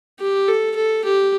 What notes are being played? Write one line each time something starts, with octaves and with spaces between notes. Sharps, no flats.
G4
A4
A4
G4